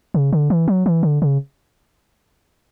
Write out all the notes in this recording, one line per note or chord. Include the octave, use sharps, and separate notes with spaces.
C#3
D3
E3
F#3
E3
D3
C#3